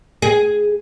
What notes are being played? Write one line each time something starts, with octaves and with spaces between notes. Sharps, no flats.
G#4